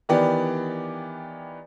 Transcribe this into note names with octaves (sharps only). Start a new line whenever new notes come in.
D#3 E3 B3 G4 D5